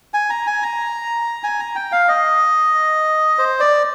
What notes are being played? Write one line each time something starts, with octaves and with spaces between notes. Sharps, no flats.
G#5
A#5
G#5
A#5
G#5
A#5
G5
F5
D#5
C5
D5